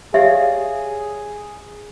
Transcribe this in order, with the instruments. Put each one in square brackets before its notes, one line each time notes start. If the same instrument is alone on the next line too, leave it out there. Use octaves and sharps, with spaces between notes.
[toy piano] G4 E5 [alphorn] G#4 [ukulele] C#5 D5 F5